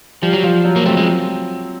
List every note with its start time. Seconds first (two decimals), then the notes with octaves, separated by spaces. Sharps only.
0.22 F3 G3
0.33 F#3
0.43 F3 F4
0.65 F#3
0.76 A#3
0.86 A3 C4
0.97 G#3